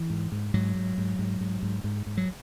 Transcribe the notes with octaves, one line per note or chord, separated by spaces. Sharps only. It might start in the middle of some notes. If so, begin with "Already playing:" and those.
Already playing: E3
G#2
G#2
G#2 F#3
G#2
G#2
G#2
G#2
G#2
G#2
G#2
F#3